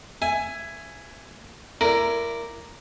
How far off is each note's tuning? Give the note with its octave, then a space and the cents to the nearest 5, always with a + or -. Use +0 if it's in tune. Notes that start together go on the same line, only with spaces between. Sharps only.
E5 +20 G#5 +0
E4 +25 A#4 +0 D5 +0